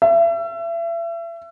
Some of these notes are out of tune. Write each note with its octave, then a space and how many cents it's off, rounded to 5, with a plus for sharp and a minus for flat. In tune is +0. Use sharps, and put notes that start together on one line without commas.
E5 +35